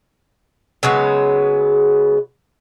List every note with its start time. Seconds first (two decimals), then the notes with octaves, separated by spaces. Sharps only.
0.83 C#3 F#3 G#3 B3